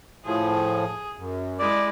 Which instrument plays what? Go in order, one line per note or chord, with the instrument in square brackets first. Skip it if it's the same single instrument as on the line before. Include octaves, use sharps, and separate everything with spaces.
[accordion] A2 F3 [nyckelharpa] G#4
[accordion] F#2
[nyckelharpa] G#3 E4 [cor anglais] D5